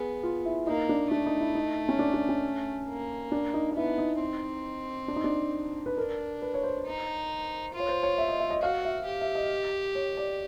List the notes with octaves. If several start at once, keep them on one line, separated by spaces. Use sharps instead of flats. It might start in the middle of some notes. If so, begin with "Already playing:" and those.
Already playing: B3 G#4
F4
E4
A#3 D#4
D4
A3 D4
D#4
E4
D#4
C#4
D4
D4
C#4
A#3
D4
D#4
D#4
B3 E4
D#4
C4
D4
D#4
D4
B4
D4 A#4
B4
C#5
C5
D#4
F4
C#5
C5
C#5
E5
D#5
E5
D#5
F#4 F5
E5
G4
E5
D#5
C#5
D5